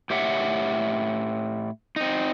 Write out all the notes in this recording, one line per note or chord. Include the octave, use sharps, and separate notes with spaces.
A2 G4 C#5 E5 F#5
C4 D#4